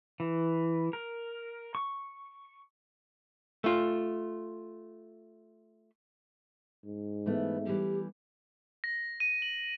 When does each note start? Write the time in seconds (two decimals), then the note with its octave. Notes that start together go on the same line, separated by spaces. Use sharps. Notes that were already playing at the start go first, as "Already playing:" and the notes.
0.20 E3
0.93 A#4
1.75 C#6
3.64 A3 F4
6.85 G#2
7.26 E3 A3 B3
7.67 E3 G3 G4
8.84 A#6
9.20 D#7
9.42 F#7